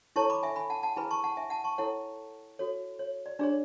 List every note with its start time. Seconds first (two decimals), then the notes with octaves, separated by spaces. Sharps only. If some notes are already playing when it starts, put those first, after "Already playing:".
0.16 E4 A4 C#5 A5 C#6
0.30 B5 D6
0.43 E5 G#5
0.56 G#5 B5
0.70 F#5 A5
0.83 F#5 A5
0.96 E4 G#4 B4 G#5 B5
1.11 A5 C#6
1.24 F#5 A5
1.37 E5 G#5
1.50 F#5 A5
1.64 A5 C#6
1.78 E4 A4 C#5 F#5 A5
2.59 F#4 A4 C#5
2.99 C#5
3.26 D5
3.39 D4 G#4 C#5 D5